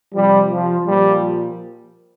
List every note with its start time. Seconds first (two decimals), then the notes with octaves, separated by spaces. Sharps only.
0.13 C3 F3 G3
0.50 F3
0.86 A#2 F3 G3